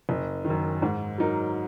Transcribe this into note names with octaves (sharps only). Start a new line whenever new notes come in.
F#1
D#3
F#2
G#2
F#3 D#4 A#4